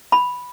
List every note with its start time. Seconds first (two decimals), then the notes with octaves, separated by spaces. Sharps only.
0.12 B5